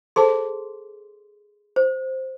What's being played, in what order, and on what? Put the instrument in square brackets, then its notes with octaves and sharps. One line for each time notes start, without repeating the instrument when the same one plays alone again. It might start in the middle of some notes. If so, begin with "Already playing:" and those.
[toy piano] G#4 C6 [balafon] A4 C5 A5
[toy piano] C5